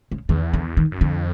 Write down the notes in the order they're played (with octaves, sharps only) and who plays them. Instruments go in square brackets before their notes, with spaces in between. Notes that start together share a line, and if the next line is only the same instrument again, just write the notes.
[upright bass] C#3
[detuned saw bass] E2 [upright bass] D#3
[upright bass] D3
D#3
[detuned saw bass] F#2
[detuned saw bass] F2 [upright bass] D3